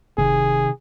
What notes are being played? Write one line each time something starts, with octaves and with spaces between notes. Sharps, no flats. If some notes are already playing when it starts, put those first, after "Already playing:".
F1 C3 D#3 G#4